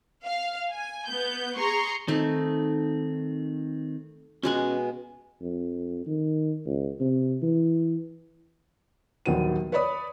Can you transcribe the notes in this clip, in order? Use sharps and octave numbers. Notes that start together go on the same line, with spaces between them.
F5
G#5
B3 G6
G#4 A#5 C6 C#6
D#3 A3 C4 D#4
B2 G#3 C#4 F#5 G#5
F2
D#3
C#2
C3
E3
A#1 D#2 F#3 B3 D#7
B4 C#5 D5 B5 D#6